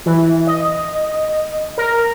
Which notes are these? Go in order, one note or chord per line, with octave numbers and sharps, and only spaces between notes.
E3
D#5
A#4